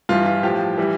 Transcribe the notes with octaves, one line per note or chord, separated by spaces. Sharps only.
G2 E3 G3 F4
F4
A2 F3 G4
E3 G3